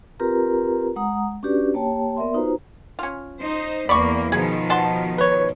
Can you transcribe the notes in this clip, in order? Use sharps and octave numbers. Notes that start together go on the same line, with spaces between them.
C4 F4 G4 A#4 B4 A#5
G#3 F#5 A#5 D#6
C#4 D4 F#4 G4 B4 D5
A#3 G4 C#5 G5 A5
B3 A#4 D5 E5 C6
D#4 F4 F#4 B4 C5 A#5
C#4 F4
D#4 C5
E2 A#3 D5 B5 C#6
B2 D#3 F3 G#4
F#4 A5 C6
B4 C#5